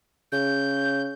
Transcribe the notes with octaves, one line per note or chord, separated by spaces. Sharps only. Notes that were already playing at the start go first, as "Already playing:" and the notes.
C#3 G6